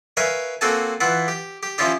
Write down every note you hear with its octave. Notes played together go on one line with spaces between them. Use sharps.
A#4 B4 C#5 E5 F5 G#5
A#3 C4 F#4 A4 G#5 A5
E3 E4 F4 F#5
G4
G4
F3 C#4 E4 F4 G4